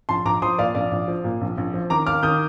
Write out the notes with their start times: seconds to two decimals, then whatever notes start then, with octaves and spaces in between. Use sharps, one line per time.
0.09 A#1 A5 C6
0.25 A#1 A#5 D6
0.42 F3 C6 D#6
0.58 A#2 D5 F5
0.75 A#1 D5 F5
0.91 A#1
1.08 F3
1.24 A#2
1.41 A#1
1.58 A#1
1.74 F3
1.90 D#3 A#5 D6
2.06 D#2 D6 F6
2.23 D#3 D#6 G6